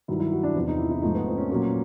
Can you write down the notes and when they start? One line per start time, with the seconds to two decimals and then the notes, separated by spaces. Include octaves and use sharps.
0.08 G2 D#3 F#3 E4
0.20 E4
0.32 F#4
0.43 D4
0.55 E2 C3 F3
0.68 D#4
0.78 E4
0.91 E4
1.02 G#2 F3 A3 D#4
1.15 B3
1.27 C4
1.38 C#4
1.50 A#2 F#3 A#3